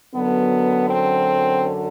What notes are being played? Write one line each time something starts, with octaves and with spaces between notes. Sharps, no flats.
F#2 D3 F#3 B3
C4